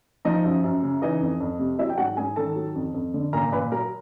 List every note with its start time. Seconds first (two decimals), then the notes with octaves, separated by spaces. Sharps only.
0.25 F3 D#4 D#5
0.44 F#2
0.64 F#2
0.83 C#3
1.02 E3 D#4 D#5
1.21 F2
1.40 F2
1.59 C3
1.79 F#3 E4 E5
1.90 G5
1.98 G#2 F#4 F#5
2.17 G#2 G#4 G#5
2.36 D#3 A4 A5
2.56 F#3
2.75 F2
2.94 F2
3.14 D3
3.33 A#2 A#4 A#5
3.52 A#2 B4 B5
3.72 F#3 A#4 A#5